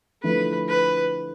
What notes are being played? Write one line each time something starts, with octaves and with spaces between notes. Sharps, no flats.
D3 F3 A3 E4 B4
B4